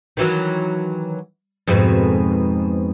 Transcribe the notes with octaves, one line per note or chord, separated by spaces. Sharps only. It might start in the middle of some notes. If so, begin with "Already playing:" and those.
D#3 E3 F#3
F2 G#2 B2